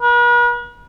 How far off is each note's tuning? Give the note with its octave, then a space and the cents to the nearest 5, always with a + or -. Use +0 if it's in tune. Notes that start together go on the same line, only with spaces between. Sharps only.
B4 -45